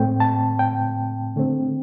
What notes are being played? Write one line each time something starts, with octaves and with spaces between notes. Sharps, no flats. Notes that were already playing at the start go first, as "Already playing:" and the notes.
Already playing: A2 A3 C4 G5
A5
G5
D3 A3 C4